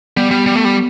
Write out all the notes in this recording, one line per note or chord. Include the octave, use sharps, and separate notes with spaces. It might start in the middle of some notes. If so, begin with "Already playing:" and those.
G3 B3
G3
G3
A3
G3